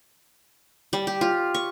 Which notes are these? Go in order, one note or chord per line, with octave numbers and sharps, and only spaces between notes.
G3
G4
F4
C#6